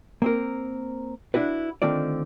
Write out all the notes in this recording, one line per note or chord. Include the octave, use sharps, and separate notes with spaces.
A#3 C4 A#4
D4 E4 F#4 B4
D3 D#3 A3 C4 F4 D5